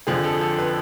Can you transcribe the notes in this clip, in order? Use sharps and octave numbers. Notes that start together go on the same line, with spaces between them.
F2 D3 F3 G#4
A4
A4
B4